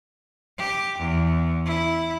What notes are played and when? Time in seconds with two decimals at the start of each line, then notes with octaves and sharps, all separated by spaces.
0.58 G4
0.99 E2
1.66 E4